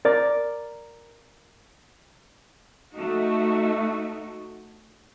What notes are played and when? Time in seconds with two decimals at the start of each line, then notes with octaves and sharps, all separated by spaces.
0.05 A#4 D5
2.92 A3 D#4 F#4